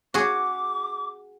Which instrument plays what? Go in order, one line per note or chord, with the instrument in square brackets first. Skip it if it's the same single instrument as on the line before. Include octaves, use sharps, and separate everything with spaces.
[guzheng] F#4 G#4 [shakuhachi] D6